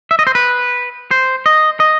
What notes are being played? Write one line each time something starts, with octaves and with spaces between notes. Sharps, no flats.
E5
D#5
C5
B4
C5
D#5
D#5